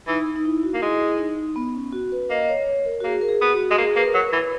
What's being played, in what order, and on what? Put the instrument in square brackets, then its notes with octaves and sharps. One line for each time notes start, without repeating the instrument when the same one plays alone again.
[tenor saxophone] E3 [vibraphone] D#4
[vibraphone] D#4
E4
F#4
[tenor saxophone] A#3
[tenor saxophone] G#3 [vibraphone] E4
[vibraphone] D#4
B3
C#4
F#4
B4
[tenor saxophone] A#3 [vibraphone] D#5
[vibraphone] C#5
C#5
A#4
F#4
[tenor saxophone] A#3 [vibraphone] G#4
[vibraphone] A#4
G#4
[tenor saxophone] B3
[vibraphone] F#4
[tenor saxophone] G#3
[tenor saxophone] A#3 [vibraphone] G#4
[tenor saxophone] A#3 [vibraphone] B4
[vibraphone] A#4
[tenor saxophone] F#3
[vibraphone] B4
[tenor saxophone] E3